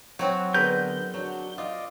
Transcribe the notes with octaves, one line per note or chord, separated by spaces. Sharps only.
F#3 C4 F#4 C#5
D3 B3 G#4 A#4 B4 D5 G6
F#3 D4 F#4
F4 D5 D#5